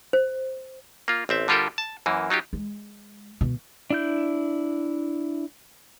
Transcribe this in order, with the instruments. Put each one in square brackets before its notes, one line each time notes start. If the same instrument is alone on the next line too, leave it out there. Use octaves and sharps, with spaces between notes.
[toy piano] C5
[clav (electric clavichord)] A#3 F4
A1 C4 E5
D3 G3 F4 G4 A4 A#4
A5
F#2 E3 A#3
F#3 D#4 F4 G4
[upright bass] G#3
B2
[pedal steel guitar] D4 E4 G6